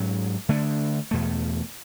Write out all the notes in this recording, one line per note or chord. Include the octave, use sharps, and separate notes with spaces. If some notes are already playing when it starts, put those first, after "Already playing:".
Already playing: G#2 F#3 C#4
D3 A3 D4
E2 B2 A3